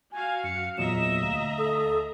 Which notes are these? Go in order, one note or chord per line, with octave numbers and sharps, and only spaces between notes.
F#4 F5 G#5
F#2 C#7
E2 A#2 F#3 D#5 E5 A#5 E7
D2 F5
A4 D#6